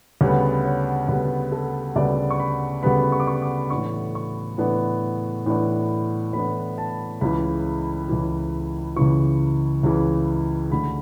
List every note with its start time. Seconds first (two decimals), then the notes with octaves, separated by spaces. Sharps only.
0.21 D2 C#3 G3 B3 C#5
0.64 C#5
1.09 D2 C#3 G3 B3 B4
1.52 A4
1.96 D2 C#3 G3 B3 D5
2.31 C#6
2.40 B5
2.83 D2 C#3 G3 B3 B5
3.12 C#6
3.20 D6
3.27 C#6
3.42 D6
3.70 A2 E3 B3 D4 C#6
4.15 C#6
4.58 A2 E3 B3 D4
5.46 A2 E3 B3 D4
6.33 A2 E3 B3 D4 B5
6.78 A5
7.21 C#2 C#3 E3 B5
8.09 C#2 C#3 E3
8.96 C#2 C#3 E3 C#6
9.83 C#2 C#3 E3
10.71 D2 D3 A3 D4 B5